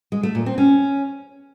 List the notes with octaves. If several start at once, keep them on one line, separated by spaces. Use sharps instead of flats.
G#3
A3
A#2
C4
C#4